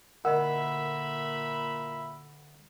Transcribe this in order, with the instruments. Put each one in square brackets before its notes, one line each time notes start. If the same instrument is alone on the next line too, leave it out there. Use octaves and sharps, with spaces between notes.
[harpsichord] D2 [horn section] A#2 E5 B5 [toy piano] A#4 D#5 [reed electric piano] F#5 E6